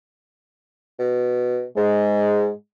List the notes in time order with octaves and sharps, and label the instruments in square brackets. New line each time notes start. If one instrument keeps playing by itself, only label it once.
[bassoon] B2
[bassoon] G#2 [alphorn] G#3